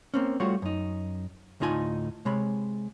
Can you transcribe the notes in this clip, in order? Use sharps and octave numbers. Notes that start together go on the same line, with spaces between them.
A#3 C4 C#4
G3 A3 F4 F#4 C#5
F#2 D#4
D2 A2 D#4 F4 G#5
C3 G#3 C#5 B5